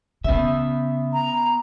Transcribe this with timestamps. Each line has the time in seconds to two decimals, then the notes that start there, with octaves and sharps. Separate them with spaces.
0.24 C#3 B3 E5
1.13 A#5